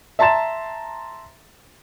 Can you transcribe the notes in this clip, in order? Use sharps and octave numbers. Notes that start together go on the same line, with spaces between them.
E5 A5 A#5 C6 A6 E7